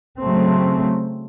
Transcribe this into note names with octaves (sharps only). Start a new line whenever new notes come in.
C#3 F#3 A3 C4